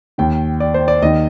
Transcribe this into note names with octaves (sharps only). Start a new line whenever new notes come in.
D#2 D#3 G5
D5
C5
D5
D#2 D#3 D#5